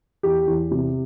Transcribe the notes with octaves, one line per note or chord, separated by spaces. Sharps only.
E2 G4
E2
C3